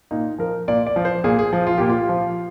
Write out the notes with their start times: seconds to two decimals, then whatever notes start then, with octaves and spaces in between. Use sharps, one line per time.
0.11 A#2 D#4
0.39 F3 A#4
0.68 A#2 D5
0.87 D5
0.96 F3
1.05 C5
1.24 A#2 G#4
1.39 G#4
1.53 F3
1.67 F4
1.78 A#2 G4
1.89 F4
2.09 F3